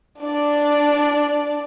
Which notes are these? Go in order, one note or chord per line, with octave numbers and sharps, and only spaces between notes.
D4 D5